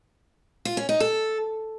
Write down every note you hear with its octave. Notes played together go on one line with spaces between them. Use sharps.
F4
C#4
D#4
A4